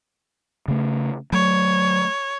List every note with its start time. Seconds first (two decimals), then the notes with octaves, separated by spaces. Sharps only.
0.68 C#3 A3
1.32 F#3 A3 C#5